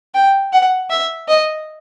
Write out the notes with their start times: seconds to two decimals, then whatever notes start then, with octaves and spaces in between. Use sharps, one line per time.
0.14 G5
0.53 F#5
0.90 E5
1.28 D#5